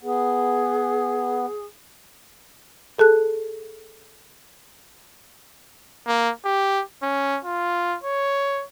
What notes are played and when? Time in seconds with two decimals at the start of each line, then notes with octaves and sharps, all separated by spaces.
0.03 B3 G#4
2.99 G#4 A4 A5 F#6
6.07 A#3
6.45 G4
7.03 C#4
7.45 F4
8.04 C#5